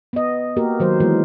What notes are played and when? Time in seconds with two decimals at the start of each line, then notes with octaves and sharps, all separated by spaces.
0.13 B3 D#5
0.57 A#3 F#4 G4 A#4
0.80 D#3 F#3 C5
1.00 E3 G#3 B3 A#4